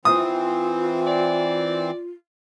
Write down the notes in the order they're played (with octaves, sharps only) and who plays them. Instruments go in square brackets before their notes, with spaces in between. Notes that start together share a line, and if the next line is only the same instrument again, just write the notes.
[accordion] E3 C4 [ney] F4 [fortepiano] D#6
[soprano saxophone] D5